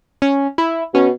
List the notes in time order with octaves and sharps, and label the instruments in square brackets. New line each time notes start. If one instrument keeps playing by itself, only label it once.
[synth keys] C#4
E4
[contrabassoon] B2 [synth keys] C#4